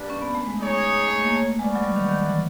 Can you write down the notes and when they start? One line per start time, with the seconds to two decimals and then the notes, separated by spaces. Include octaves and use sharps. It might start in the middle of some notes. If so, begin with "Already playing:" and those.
Already playing: G3 A#3 D4 G4 B4
0.10 C#4
0.22 B3
0.35 A3
0.47 G#3
0.59 D#4 G#4 C#5
1.08 A3
1.22 A#3
1.36 A3
1.59 G#3 C#4 F#4 B4 D5 F#5
1.76 F#3
1.84 G3
1.96 D#3
2.08 D#3
2.25 E3